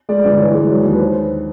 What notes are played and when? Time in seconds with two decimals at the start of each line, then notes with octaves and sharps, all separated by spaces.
0.09 G#3 D5
0.24 G1 D5
0.38 E3 C#5
0.54 G#3
0.69 F#3 C#5
0.84 D#2 C#5
0.93 B4
0.99 C5